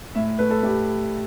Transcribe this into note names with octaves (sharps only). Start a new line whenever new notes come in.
A2 E5
A3 B4
A4
A2 G4